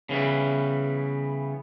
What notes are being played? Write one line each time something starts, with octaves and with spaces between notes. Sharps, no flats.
C#3 E3 G3 B3